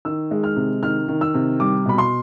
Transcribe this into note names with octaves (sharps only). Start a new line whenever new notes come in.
D#3 E6
G#3
F6
C3
D#3 F6
D#3
E6
C3
G3 D6
B2 B5
C6